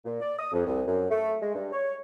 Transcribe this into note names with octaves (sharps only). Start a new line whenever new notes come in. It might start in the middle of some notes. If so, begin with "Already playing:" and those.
A#2
D5
D#6
F2
C2
F#2
A3
G#3
G2
C#5